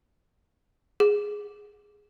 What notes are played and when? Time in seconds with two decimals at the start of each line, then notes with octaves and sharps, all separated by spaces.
1.00 G#4